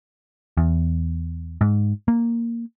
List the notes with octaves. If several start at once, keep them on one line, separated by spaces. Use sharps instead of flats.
E2
G#2
A#3